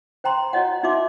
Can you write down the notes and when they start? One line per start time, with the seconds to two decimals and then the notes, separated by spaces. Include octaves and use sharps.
0.24 C5 G5 A#5 C6
0.53 F#4 C#5 D#5 F#5
0.83 D#4 F#4 E5 C6 D6